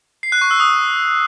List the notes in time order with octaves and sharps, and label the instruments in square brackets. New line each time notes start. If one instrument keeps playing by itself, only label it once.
[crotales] C7
F#6
C#6
E6
D#6